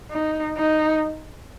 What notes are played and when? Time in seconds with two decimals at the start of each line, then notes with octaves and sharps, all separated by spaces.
0.10 D#4
0.57 D#4